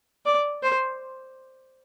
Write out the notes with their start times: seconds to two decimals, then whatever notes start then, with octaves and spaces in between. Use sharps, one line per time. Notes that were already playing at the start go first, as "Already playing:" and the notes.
0.26 D5
0.63 C5